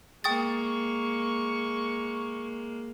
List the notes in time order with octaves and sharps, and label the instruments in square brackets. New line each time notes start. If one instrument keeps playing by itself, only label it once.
[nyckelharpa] G#3 A#3 [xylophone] G5 D#6 A6 [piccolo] C#6